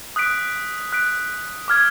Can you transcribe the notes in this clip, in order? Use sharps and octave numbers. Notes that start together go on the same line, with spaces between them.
D#6 F#6 B6 D7
F#6 B6 D7
D6 F6 G#6